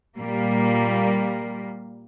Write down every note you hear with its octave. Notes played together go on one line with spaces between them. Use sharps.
A#2 G3 A#3